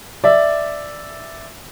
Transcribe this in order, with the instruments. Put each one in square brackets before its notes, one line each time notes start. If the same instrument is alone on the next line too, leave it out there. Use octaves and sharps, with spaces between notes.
[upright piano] D5 E5